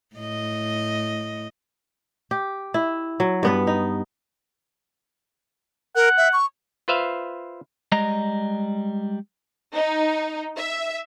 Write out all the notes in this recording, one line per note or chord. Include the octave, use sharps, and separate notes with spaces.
A2 D#5
G4
E4
F#3
G2 B3 B4
D#4
A#4 F#5
E5
C#6
F4 B4 C5 E5 F5
G3 G#3 D#5 A#5
D#4
E5